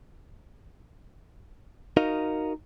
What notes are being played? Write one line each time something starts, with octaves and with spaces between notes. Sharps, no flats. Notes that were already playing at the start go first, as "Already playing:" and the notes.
D#4 F#4 A#4 D#5 F5